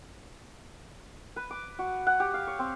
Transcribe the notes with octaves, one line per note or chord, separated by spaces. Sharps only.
B4
D6
F#4
F#5
G4
F5
C#5
C4